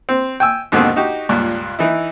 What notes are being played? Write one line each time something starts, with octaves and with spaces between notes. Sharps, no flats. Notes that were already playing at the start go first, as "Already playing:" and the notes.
C4
G5 G#5 E6
D#2 G#2 B2 D3 D#3 C4
D#4 F#4 G4
C#2 G2 A#2
E3 D#4 E4